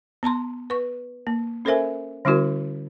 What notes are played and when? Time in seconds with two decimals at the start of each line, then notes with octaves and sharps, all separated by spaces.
0.23 B3 A5 A#5 C6
0.70 B4 C#6
1.27 A#3
1.65 C#4 A4 A#4 C5 E5 G#5
2.25 D3 G3 C#4 E4 F#4 A#4